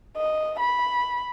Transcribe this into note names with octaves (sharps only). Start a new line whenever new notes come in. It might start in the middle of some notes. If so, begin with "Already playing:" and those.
D#5
B5